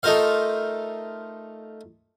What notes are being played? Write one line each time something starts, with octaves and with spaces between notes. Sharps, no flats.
A3 D#4 F4 A#4 C5 F5